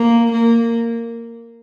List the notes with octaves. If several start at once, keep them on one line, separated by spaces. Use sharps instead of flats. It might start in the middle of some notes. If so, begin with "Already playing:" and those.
Already playing: A#3
A#3